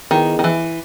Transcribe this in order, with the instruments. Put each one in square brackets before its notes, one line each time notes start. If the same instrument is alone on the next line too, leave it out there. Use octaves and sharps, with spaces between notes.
[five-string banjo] D#3 [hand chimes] B3 E4 G#4 B4 D#5
[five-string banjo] D#3
E3